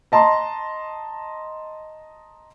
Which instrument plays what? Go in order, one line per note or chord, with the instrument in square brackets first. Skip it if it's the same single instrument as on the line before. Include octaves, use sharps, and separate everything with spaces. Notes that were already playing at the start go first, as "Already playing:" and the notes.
[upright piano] D#5 A5 A#5 C6